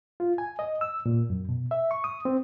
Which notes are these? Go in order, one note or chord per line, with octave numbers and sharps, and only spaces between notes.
F4
G#5
D#5
E6
A#2
F#2
B2
E5
C#6
D#6
C4